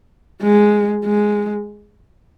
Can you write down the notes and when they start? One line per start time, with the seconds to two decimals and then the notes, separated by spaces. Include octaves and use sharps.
0.42 G#3
1.05 G#3